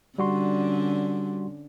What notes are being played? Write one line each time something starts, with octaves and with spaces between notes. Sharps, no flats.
D3 G3 C#4 F#4 C6